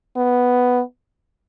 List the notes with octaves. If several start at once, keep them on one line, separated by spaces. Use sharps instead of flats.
B3